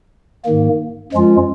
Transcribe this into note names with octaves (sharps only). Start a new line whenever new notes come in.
G#2 D#3 A#3
F#2 F3 G#3 C#4 F4